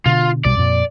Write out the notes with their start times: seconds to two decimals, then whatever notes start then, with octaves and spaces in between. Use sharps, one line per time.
0.06 B2 D3 F4
0.45 B1 B2 G3 D5
0.57 F2 A#2